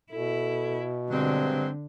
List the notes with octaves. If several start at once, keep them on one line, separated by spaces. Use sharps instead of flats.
B2 E4 A4
G2 D3 F#3 G#3 C4